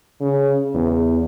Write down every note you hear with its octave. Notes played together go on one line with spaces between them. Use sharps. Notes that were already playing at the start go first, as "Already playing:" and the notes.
C#3
E2